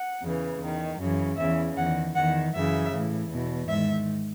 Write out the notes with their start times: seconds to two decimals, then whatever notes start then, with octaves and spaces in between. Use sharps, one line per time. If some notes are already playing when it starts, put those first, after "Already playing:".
Already playing: F#5
0.21 E2 C#3 E3
0.60 E2 D#3
0.98 F#2 C#3 E3
1.37 E2 C#3 E3 E5
1.76 E2 D#3 F#5
2.14 E2 D#3 F#5
2.54 F#2 C#3 E3 E5
2.91 A2 E3
3.30 E2 B2
3.68 G#2 D#3 E5